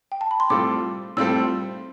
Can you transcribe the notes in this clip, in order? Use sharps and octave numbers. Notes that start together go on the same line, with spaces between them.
G5
A5
B5
C6
A2 G3 C4 F4 A4 D6
A2 G3 C4 F4 A4 E6